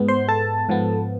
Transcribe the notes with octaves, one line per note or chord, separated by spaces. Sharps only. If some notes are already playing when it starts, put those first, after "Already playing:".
Already playing: G#2 G#3 B3
C5 C6
A4 A5
G#2 F3 B3